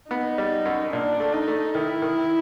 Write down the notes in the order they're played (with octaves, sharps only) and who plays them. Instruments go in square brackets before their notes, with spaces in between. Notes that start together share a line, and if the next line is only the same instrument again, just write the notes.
[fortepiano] B3 [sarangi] D#4
[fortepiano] G3
F#2
[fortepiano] A#2 [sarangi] D4
[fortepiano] A3
[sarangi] D#4
[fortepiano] A3
[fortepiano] D#3 [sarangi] E4
[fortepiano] D#3